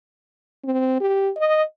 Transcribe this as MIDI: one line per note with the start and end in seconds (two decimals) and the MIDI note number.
0.64 0.99 60
1.01 1.30 67
1.37 1.63 75